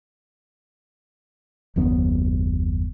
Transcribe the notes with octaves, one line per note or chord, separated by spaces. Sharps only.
F#1 D#2 F#3 B3